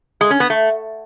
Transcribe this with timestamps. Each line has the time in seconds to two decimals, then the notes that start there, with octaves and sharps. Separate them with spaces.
0.21 G#3
0.31 C#4
0.40 B3
0.50 A3